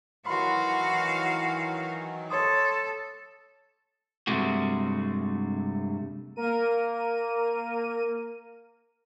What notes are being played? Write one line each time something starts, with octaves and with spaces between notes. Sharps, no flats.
D#3 E3 F#3 F#4 F5 B5 C6
A4 C#5 C6 D#6
G2 C3 G#3 A3 F#4
A#3 A#4 D#7